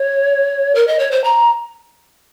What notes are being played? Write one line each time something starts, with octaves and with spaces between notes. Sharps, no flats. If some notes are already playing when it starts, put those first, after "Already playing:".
Already playing: C#5
A#4
D#5
C#5
C5
A#5